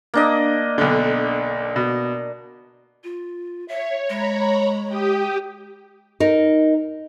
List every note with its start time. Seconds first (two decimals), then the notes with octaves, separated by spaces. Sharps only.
0.14 A#3 D4 D#5
0.78 B1 D3
1.76 B2
3.04 F4
3.68 C#5 E5
4.09 G#3 C#5 A#5 B5
4.89 G4 G5 D#6
6.20 D#4 A#4